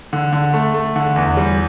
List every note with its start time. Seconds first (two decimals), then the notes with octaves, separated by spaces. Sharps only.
0.13 D3
0.32 D3
0.53 A3
0.74 A3
0.96 D3
1.16 E2
1.37 G3